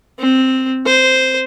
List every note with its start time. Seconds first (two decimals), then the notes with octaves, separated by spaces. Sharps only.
0.19 C4
0.85 C5